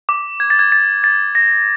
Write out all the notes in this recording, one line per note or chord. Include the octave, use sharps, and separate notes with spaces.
D6
G#6
A6
G#6
A6
A6
A#6